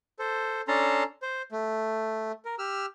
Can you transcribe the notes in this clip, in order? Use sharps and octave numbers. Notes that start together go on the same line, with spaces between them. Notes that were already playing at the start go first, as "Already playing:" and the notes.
A4 C5
C#4 D4 A4 A5 A#5 C6
C5
A3
A#4
G4 E6 F6